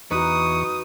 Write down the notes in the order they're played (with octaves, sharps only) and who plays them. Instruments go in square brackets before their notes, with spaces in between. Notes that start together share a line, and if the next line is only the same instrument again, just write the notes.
[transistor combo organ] E2 C#6 [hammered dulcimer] D#4 [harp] F#4 B4 [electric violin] D#6